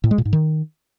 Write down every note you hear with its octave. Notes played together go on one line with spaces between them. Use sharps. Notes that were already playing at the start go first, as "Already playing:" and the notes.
A2
G#3
A#2
G#2
D#3